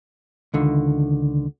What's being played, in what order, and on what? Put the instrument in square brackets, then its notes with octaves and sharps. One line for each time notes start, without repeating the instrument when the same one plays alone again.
[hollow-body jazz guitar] C#2 D3 D#3